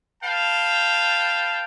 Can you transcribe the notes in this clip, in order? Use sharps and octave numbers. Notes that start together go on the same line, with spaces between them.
B4 F5 G5 A5